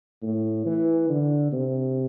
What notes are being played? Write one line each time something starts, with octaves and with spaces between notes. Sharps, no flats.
A2
E3
D3
C3